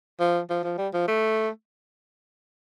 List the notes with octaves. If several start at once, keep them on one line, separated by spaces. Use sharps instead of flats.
F3
F3
F3
G3
F3
A3